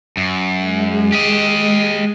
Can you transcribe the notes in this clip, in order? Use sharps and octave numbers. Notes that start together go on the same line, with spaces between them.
F#2
G#3
G4 D#5